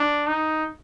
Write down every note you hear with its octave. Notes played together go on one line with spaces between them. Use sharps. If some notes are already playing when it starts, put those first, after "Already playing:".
Already playing: D4
D#4